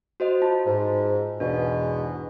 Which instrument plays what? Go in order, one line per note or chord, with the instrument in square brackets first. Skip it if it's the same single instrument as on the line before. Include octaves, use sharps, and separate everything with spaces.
[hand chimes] F#4 C5 D#5
F4 A5
[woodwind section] G#2
[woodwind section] E2 G#2 B2 [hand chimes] D4